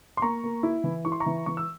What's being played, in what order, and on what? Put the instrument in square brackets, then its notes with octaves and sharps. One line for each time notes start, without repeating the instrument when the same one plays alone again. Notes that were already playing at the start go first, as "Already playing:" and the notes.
[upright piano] C6
A#3 A#5 C#6
A#3
E4
E3
E4 C#6
C6
A#5 C#6
E3
E3 C#6
E6